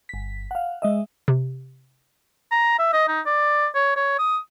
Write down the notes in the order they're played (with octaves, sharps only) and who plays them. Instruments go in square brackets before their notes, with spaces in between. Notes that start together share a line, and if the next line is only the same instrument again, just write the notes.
[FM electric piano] G1 B6
F5 F#5
G#3 D#5 E5
[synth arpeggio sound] C3
[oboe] A#5
E5
D#5
D#4
D5
C#5
C#5
D#6